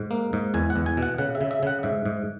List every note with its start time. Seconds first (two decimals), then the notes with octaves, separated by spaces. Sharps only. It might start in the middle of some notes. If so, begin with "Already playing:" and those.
Already playing: G#2
0.11 A#3
0.33 G#2
0.54 E2 G#5
0.70 F#5
0.76 E2
0.86 G#5
0.97 B2
1.02 F#5
1.18 C#3 F#5
1.35 E5
1.41 C#3
1.51 E5
1.63 C#3 F#5
1.83 G#2 E5
2.06 G#2